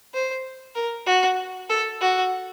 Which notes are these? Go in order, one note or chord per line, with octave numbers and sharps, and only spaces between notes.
C5
A#4
F#4
A4
F#4